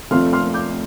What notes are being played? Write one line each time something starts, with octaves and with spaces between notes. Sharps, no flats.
F1 F2 F3 A3 C6 F6
C6 F6
D6 G6